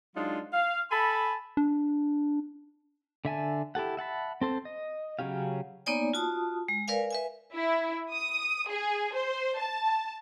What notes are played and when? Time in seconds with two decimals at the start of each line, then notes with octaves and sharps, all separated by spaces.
0.16 F#3 G#3 D4 D#4 F4
0.53 F5
0.91 A4 G#5 A5 B5
1.57 D4
3.25 D3 E5 G#5 A5
3.75 E4 G4 A4 F#5
3.97 E5 F#5 A5 B5
4.41 C4 A4 C5
4.65 D#5
5.19 C#3 F#3 C#4 G4 F5
5.86 A#3 B3 D#4 C#5 D5 G#5
6.14 F4 F#4 A5 D#6
6.68 G#3
6.88 A#4 B4 D5 F5 G#5
7.11 B4 E5 G#5
7.54 E4
8.11 D#6
8.70 G#4
9.15 C5
9.58 A5